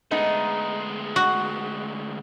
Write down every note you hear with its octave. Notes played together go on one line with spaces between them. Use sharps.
D2 G#3 A3 B3 D#4
F#4